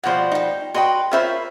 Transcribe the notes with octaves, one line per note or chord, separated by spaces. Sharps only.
B2 F3 G3 C5 F#5
D#4 G5
F#4 B4 D#5 G5 C6
C#4 F4 A#4 C5 E5 B5